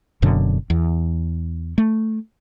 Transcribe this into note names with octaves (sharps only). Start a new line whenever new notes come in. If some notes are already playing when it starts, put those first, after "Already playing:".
F#1 F#2 B2 D3
E2
A3